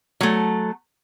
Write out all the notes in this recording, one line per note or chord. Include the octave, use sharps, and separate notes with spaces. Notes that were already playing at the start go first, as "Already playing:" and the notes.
F#3 A3